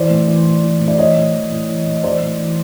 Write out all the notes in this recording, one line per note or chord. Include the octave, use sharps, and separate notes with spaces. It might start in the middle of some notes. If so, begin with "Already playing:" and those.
Already playing: E3 C5 D5
A2
E3
A2
E3
A2
D5
E3 C#5 D#5
A2
E3
A2
E3
A2
E3 C5 D5
A2
E3